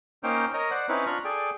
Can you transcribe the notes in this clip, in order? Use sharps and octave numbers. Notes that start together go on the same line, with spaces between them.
A#3 C#4 D#4 C5 C#5 G5
A#4 C#5 D#5
C5 D5 F#5
C4 C#4 D#4 E4 B4 C#5
D4 F4 A#5 B5 C#6
G#4 A4 D5 G5